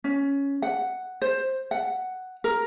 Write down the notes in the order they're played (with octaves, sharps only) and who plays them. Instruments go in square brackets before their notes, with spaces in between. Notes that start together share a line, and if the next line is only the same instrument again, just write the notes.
[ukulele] C#4
F#5
C5
F#5
A#4